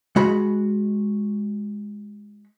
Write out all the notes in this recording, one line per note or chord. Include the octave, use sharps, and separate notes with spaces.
G#3 F#4 B5